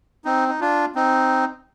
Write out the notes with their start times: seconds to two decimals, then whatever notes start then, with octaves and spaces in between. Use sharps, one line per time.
0.25 C4 D#4
0.49 D#4
0.61 D4 F4
0.95 C4 D#4